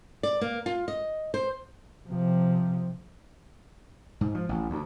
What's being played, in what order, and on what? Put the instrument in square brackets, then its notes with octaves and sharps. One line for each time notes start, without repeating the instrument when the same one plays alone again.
[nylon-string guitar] D5
A#3
F4
D#5
C5
[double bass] C3 F3
[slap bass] G#2
F3
A1
D2